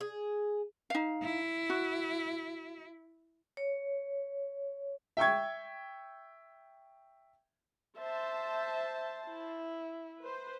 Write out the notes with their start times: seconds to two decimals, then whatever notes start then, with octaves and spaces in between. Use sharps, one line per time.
0.01 G#4
0.90 D#4 F5
1.22 E4
1.70 F#4
3.57 C#5
5.17 E5 G5 C#6 G#6
7.99 C5 E5 A5
9.29 E4
10.22 B4 C5